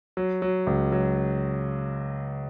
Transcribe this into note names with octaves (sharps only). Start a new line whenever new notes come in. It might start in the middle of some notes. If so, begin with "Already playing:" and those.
F#3
F#3
C#2
F#3